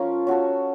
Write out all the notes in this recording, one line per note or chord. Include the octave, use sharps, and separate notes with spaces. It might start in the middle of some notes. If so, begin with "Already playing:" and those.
Already playing: F3 C#4 F4 A#4
C#4 F#4 A4